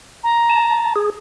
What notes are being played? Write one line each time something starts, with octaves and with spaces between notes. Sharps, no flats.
A#5
A5
G#4